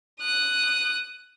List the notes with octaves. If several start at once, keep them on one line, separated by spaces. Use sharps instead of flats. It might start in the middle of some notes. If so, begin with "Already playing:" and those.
D#6 F#6